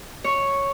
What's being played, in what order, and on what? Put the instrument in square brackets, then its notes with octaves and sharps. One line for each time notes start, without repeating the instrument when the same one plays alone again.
[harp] C#5